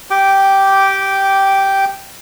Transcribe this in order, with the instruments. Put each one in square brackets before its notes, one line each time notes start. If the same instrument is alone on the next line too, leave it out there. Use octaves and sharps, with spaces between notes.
[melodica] G4 G5 D6